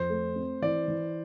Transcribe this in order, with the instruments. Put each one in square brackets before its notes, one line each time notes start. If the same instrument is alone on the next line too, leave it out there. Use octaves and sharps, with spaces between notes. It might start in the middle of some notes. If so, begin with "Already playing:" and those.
Already playing: [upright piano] F2 [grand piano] C5
[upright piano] A3
C4
[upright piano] E3 [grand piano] D5
[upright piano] E3